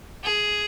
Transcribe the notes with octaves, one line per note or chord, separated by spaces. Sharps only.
G#4